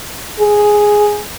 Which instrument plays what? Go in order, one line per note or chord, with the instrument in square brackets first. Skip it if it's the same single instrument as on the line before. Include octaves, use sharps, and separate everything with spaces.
[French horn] G#4